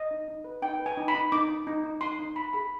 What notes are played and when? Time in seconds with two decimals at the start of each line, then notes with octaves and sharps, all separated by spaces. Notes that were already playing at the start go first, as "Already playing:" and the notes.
Already playing: D#5
0.11 D#4
0.28 D#4
0.44 B4
0.62 D#4 G5
0.80 B4
0.86 G#5
0.97 D#4
1.08 B5
1.15 D#4
1.32 D#4 D6
1.49 D#4
1.67 D#4
1.84 D#4
2.01 D#4 C6
2.19 D#4
2.36 D#4 B5
2.53 G#4 B5